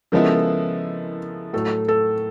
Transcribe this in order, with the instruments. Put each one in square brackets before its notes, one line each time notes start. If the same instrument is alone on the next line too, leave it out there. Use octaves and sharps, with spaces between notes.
[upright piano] C#3 F3 G#3 B3 E4 [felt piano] A#4
[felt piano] A4
A#4
[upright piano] A2 F#3 A3 [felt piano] A4
[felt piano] A4